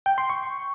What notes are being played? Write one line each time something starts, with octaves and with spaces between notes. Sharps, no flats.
G5
C6
C#6